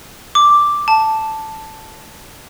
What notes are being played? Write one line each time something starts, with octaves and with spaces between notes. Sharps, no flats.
D6
A5